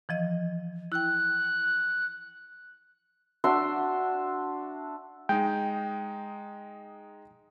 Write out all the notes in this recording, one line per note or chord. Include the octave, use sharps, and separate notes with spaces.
E3 F3 D#5
E4 G5 F#6
D4 F#4 E5 C6
G#3 D#4 G5